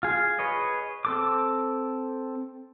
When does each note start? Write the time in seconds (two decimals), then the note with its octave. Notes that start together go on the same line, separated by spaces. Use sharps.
0.03 F4 G#4
0.39 G#4 B4 C#5 D#5
1.05 C4 A4 D6